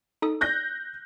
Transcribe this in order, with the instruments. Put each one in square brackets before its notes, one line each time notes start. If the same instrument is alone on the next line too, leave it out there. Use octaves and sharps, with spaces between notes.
[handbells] D#4 A4 D#6
[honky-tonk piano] F#6 G6 A#6